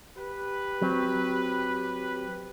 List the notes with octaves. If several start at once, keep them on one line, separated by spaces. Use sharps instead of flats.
G4 B4
F#3 C4